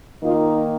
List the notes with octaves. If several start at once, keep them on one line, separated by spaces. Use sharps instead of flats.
D#3 A#3 D#4 F4